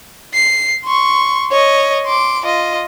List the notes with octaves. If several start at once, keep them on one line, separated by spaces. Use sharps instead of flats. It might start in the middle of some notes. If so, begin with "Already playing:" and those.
C7
C6 C#6
C#5 D#5
C6 D6
F4 D#5